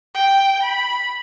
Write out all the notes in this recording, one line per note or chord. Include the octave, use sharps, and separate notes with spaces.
G5
B5